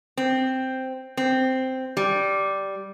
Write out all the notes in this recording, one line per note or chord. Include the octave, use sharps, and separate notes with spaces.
C4
C4
G3